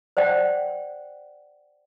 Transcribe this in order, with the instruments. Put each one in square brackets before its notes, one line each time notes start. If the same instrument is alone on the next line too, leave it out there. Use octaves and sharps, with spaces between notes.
[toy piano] C5 D5 F#5 G5